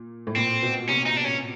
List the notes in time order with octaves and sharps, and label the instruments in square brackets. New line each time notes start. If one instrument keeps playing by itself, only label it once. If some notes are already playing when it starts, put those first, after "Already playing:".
Already playing: [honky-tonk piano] A#2
A2
[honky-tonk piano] A#2 [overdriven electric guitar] C4
[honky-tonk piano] B2
[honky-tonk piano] C3 [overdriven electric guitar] C#4
[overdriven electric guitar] D#4
D4
C#4